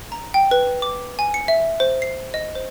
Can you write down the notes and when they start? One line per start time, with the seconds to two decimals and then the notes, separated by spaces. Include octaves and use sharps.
0.12 A#5
0.34 G5
0.51 B4
0.82 D6
1.19 G#5
1.34 C#7
1.48 E5
1.80 C5
2.02 C7
2.34 D#5
2.55 C5